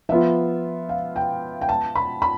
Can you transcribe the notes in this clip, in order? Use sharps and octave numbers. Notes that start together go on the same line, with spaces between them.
F3 B3 F4 E5
F5
G5
G5
A5
B5
B5